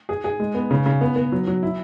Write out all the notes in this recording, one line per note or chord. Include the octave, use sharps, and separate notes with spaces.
G#4
G#4
G#3
B3
C#3
C#3
B3
B3
F#3
F#3
E4